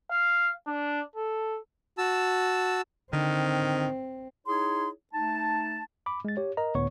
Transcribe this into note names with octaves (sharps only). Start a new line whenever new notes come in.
F5
D4
A4
F#4 A5 E6
D3 D#3 C4
D#4 E4 G#4 C#5 C6
A3 D#4 A5
B5 D6
G#3 A6
G4 C#5
A#4 D#5 A#5
C#2 A2 D3 B3 C#5 C#6